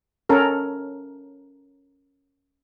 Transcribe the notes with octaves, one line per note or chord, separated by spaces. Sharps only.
C#4 A4 A#4